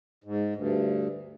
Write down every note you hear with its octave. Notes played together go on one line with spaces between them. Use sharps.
G#2
D2 G2